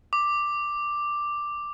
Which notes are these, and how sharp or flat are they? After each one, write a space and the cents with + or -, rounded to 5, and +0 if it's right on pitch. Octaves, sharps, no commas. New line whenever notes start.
D6 +5